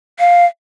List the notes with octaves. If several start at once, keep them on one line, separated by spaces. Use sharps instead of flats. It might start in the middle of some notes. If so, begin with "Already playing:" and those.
F5